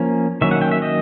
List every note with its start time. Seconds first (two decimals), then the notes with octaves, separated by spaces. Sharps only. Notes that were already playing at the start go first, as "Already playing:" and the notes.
Already playing: F3 A#3 C#4
0.41 D#3 F#3 A#3 C#4 E5
0.51 F#5
0.62 G5
0.71 E5
0.82 D#5